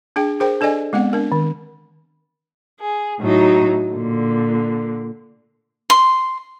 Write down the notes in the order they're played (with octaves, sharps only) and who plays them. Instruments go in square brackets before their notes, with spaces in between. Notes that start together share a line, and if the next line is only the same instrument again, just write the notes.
[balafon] D4 G#4 G5
G#4 A#4 C5 G5
D4 A4 D5 D#5 G#5
G#3 B3 C4 F#5
D4 A#4
D#3
[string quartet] G#4
A2 F#3 D#4
A#2 D3
[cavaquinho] C6